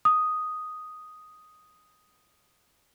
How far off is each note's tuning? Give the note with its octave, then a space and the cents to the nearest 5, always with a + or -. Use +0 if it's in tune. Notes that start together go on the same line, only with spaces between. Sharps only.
D#6 +0